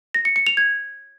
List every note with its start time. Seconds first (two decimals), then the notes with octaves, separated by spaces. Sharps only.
0.14 A#6
0.25 C#7
0.36 C#7
0.47 F7
0.57 G#6